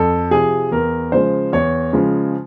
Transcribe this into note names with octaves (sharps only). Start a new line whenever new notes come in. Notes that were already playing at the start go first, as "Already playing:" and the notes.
Already playing: F2 A4
C3 F3 G#4
E2 A#4
C#3 F3 G#3 C5
E2 C#5
C#3 F3 G#3